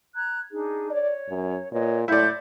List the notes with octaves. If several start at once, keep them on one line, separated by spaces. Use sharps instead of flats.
A#5 F#6 G#6
D4 D#4 G#4
C#5 D5
F#2
A#2 B4 C#5 D#5
A2 E4 D5 F#5 C6 G6